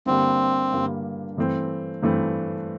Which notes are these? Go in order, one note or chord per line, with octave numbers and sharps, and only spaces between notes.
G2 D3 G3 A#3 C4
G2 D3 G3 A#3
G2 E3 A3 C4
G2 E3 A3 C4